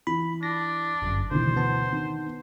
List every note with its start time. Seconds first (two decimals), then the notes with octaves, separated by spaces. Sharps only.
0.07 E3 B5
0.43 D4 A#6
1.02 G1 F#2
1.31 D2 B2 D#3 E3 C5
1.57 B3 A5
1.92 D#3